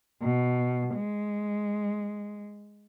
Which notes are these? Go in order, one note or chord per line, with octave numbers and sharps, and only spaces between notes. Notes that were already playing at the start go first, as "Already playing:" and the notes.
B2
G#3